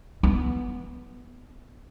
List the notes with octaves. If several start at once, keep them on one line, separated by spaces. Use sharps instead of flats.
B3